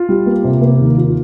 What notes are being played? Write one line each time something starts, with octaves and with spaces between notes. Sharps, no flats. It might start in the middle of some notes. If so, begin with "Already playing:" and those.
Already playing: F4
G3
A#3
C3
A#3
D#2
F4